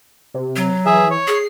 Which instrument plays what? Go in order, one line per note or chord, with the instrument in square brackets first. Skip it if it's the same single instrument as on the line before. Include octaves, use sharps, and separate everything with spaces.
[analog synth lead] C3
[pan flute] F#3
[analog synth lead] E3 [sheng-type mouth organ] G#4 E5
[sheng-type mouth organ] C#5
[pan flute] G#4 [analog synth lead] C7